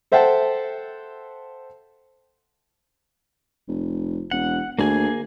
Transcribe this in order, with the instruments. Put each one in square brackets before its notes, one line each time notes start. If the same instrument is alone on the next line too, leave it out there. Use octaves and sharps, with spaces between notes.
[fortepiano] A4 C5 E5 F#5 G5 A5
[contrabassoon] F1
[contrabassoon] E1 [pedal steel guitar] F#5
[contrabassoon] D2 [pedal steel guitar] A#3 G#4 G#5